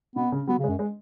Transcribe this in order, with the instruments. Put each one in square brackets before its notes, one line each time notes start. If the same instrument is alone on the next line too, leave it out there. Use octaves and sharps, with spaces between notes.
[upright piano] B2 [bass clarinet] B3
[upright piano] C#3
[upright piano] F#3 [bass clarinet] B3
[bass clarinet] C#3
[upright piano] G#3
[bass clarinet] F#2
[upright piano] G#3